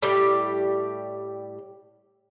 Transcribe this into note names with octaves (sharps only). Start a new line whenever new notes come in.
A2 G3 G4